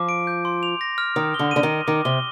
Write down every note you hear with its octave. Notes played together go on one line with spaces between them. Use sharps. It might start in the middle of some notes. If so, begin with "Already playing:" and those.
Already playing: F3 D6
D7
G6
C6
F7
A#6
F6
D#3 D#6
D3 G7
D3 D#7
D#3
A#6
D#3 D6
C3 G7